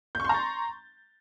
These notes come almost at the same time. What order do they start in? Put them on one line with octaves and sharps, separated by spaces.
G6 C#6 C6 A#5 A6